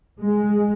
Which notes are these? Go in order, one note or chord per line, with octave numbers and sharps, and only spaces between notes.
G#3